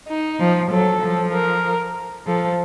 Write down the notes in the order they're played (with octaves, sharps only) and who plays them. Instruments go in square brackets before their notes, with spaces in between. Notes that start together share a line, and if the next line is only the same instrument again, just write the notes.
[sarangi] D#4
[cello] F3
[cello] F#3 [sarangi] A4
[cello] F3
[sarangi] A#4
[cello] F3 [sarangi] A4